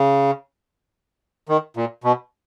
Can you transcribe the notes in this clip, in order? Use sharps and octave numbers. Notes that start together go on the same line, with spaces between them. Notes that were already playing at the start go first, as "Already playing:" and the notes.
Already playing: C#3
D#3
A#2
B2